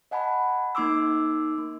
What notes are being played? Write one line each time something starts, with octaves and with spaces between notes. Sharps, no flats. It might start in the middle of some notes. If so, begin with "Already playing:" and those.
D#5 F#5 G#5 A5 B5
A#3 D#4 C6 D6 E6
A#3